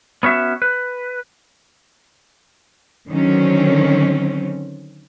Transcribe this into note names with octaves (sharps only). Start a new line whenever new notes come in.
B3 C#4 F#4 E5
B4
D3 D#3 F#3 C4 C#4